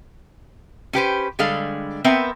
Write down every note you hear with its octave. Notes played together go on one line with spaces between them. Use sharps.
C#4 G4 B4 C5
D3 G3 G#3 D4 A4 F5
B3 C4 A#4 B4 E5 G5